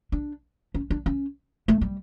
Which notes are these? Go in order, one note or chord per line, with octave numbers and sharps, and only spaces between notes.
D4
C#4
D4
C#4
A3
G3